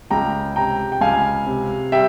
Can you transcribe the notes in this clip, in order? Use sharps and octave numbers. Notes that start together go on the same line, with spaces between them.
C#2 G5 A#5
C3 G5 A#5
G5
C#2 F5 G#5
C3
G3 E5 G5